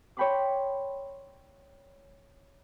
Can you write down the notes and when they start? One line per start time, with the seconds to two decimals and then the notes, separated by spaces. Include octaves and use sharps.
0.17 C#5 D5 G5 B5 C6 D6